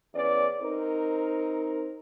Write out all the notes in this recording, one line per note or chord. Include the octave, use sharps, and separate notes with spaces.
E2 C#4 B4 D5
C4 D#4 A#4